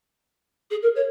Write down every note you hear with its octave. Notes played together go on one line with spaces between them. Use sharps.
G#4
A#4
C#5